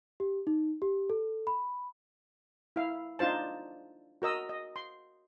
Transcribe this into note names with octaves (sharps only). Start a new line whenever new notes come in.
G4
D#4
G4
A4
B5
E4 F5
D4 D#4 F4 C5 A5
F#4 A#4 D#5 E6
D#5
C6